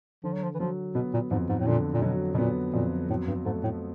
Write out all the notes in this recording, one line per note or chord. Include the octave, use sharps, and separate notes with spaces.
D3 F3
F#3
F3
E3
F3 F#3
B2 B3
A#2
F2 G#2
G#2
A2
A#2 D3
A#2
B2 F#3
B2
A#2 B3
F2 A#2
A2 F#3
G2
G#2 A3
A2